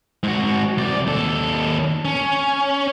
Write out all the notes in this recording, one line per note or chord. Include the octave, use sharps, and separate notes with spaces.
G#2 F#4
C2 D5
D#2 A4
C#4